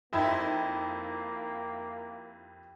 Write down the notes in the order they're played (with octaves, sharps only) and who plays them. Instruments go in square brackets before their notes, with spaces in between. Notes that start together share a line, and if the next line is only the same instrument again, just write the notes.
[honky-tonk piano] F2 D#4 G#6 [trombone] A#3 [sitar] E4 [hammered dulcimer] G4 G5 C6